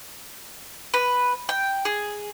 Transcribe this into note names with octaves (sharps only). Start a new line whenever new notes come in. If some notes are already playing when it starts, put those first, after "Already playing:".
B4
G5
G#4